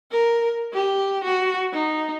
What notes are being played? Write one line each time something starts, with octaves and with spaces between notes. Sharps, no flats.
A#4
G4
F#4
D#4